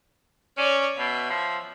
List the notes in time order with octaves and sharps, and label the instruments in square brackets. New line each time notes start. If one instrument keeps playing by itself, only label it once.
[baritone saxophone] C#4 [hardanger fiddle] C#5 D5
[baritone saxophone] B2 [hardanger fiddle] E5
[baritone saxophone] F3